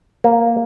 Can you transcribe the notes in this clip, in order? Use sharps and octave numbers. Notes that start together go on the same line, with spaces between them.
A#3